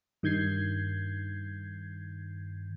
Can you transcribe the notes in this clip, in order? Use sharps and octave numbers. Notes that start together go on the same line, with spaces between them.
G2 D#3 G6 G#6 C7